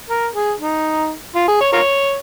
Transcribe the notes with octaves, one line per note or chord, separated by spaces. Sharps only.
A#4
G#4
D#4
F4
G#4
C#5
F4 A#4 C#5